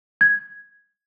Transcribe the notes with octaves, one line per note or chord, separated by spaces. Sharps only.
G#6